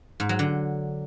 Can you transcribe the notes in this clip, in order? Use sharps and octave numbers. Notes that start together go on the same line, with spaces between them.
G#2
F#3
D3